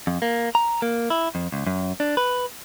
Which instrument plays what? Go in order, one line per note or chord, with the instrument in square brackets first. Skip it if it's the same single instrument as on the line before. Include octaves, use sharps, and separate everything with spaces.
[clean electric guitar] F2
A#3
A#5
A#3
E4
F2
C#2
F#2
D4
B4